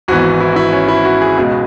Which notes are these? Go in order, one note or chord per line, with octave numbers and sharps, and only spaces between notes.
G#1 G#2 E3 B3 F#4
E4
F#4
E4
C#4
E4
F#4
G#4
C#2 B2 G#3